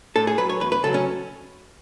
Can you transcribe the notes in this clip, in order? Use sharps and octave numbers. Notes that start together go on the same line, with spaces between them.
A2 A4
G#4
F#3 B4
C#5
E2 B4
B4
C#3 F#3 A4
C#4